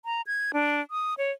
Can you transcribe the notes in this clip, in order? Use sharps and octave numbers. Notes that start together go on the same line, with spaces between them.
A#5
G#6
D4
D#6
C#5